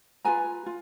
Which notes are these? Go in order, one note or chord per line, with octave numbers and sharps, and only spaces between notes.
F4 G#4 B4 G#5 A#5
F4